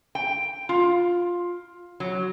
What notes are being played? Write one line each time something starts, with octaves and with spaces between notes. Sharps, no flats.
G5
F4
F#3